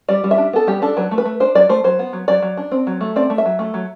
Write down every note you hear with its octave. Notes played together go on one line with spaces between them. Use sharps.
G3 D5
G3
E5
D4
B3 A4
G3 G4
D4 A4
F#3 B4
A3
B4
A3
D4 C5
F#3 D5
A3 C5
F#3 C5
B3
F#3
F#3 D5
F#3
D4
C4
F#3
A3
C4 D5
A3
E5
F#3
A3
F#3